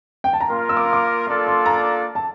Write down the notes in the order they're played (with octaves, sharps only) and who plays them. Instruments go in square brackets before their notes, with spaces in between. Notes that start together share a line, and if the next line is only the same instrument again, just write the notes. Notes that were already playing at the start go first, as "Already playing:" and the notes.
[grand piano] G5
A5
A#5
[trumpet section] A#3 F4 A#4 [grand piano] C6
[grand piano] E6
D6
C6
D6
[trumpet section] A#3 D4 F4 A4 D5 [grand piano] C6
[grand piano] C6
A#5
A5